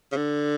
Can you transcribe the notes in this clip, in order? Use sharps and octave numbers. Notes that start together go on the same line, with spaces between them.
C#3
D3